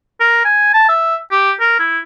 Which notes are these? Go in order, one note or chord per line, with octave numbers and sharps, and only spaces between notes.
A#4
G#5
A5
E5
G4
A#4
E4